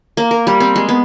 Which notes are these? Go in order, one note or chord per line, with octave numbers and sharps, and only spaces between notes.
A#3
A#4
G3
C4
G#3
B3